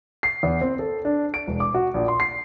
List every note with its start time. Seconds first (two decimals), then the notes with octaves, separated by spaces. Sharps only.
0.23 C7
0.43 E2
0.61 C4
0.79 A4
1.05 D4
1.34 D7
1.47 E1
1.60 D6
1.74 F#4
1.94 A#1
2.08 C6
2.20 C7